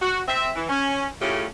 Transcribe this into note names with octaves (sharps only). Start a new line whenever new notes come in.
F#4
C4 E5
E3
C#4
A2 C#3 A3 C#4 F4 G4